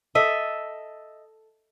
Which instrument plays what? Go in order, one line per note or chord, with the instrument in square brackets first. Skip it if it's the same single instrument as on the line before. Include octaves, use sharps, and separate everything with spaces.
[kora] A4 D#5 E5